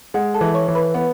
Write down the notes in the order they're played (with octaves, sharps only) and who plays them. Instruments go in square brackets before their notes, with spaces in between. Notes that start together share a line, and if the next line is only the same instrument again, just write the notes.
[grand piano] G#3 [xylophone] F#5
[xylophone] A4 A5
[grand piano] E3
[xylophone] C#5 C#6
[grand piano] E3
[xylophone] B4 B5
[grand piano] B3 [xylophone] F#5